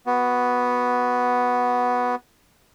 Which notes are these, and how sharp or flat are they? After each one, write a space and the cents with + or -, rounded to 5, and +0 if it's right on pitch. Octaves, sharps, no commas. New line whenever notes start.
B3 +0 F#4 +0